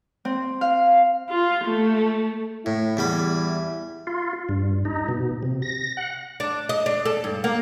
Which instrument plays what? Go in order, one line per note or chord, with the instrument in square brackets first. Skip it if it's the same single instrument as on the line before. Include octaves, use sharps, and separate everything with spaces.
[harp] C4
F5
[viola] F4
A3
[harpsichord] A2 [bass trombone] E4
[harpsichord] E2 G3 B5
[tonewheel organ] F4
G2
D#4
B2
C3
A#6
F#5
[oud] D4
D#5
D4
A4
G2
A#3